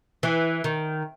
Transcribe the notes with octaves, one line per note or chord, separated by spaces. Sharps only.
E3
D#3